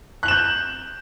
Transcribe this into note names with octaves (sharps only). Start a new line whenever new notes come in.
F#6 G6 E7 F#7